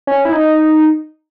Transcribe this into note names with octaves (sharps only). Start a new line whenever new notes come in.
C#4
E4
D#4